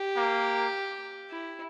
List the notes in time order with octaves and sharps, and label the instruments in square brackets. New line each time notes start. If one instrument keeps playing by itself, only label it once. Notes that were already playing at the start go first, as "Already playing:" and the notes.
Already playing: [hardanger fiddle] G4
[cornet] A#3
[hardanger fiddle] E4